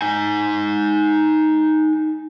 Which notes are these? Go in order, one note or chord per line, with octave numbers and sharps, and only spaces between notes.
D#4 G#5